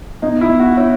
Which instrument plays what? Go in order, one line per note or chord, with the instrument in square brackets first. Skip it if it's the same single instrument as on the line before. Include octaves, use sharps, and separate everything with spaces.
[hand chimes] B3 [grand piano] D#4
[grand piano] E4
[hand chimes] B3
[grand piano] F#4
[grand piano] E4 [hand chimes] C#5